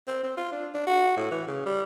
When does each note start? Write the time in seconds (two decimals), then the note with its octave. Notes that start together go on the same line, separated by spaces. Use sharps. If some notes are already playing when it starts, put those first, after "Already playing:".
0.07 C4
0.23 C4
0.37 F4
0.52 D4
0.74 D4
0.87 F#4
1.17 A2
1.31 E3
1.47 C#3
1.66 G3